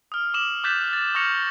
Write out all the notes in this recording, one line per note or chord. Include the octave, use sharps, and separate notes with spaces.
D#6 F6
D6 D#6 E7 F#7
D6 F#6 G6 A6 B6 E7
A6
C#6 D#6 F6 A#6 C#7 F7